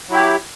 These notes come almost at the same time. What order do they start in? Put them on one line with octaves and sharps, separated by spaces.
F#3 E4 G4